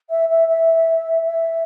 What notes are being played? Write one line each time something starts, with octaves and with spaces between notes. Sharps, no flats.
E5
E5
E5
E5